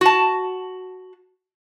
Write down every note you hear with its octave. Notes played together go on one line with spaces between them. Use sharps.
F#4 A5